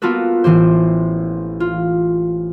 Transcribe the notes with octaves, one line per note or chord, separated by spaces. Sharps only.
A#3 B3 F4 F#4 A4 B4
A1 E3 G4 C5
F4